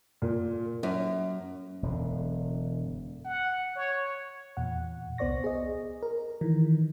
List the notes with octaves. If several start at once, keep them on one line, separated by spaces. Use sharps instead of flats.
A#2
F#2
E1 F#2 D3
F#5
C#5
E2 A#2 F#5
C2 B3 C5 D5 C#6 A#6
G#4 D#5
A#4
D#3 E3